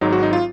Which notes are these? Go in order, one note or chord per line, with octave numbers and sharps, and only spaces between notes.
G#1 G#2 F#3 D#4
F#4
D#4
F4